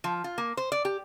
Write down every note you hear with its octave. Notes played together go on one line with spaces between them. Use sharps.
F3
F4
A#3
C5
D5
G4